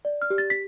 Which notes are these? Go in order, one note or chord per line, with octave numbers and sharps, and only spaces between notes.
D5
F6
G4
A6
B6